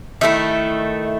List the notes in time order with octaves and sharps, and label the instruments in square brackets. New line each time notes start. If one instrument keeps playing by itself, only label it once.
[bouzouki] D#3 A3 E4 E5